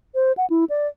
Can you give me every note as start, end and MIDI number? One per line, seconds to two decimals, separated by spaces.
0.15 0.32 72
0.37 0.46 78
0.50 0.64 64
0.69 0.87 74